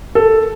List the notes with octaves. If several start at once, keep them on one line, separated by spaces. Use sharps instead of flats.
A4